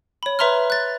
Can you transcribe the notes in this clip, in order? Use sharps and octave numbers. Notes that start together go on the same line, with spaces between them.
C#5 B5
B4 E5 A#5 C6 F6
F#6 A6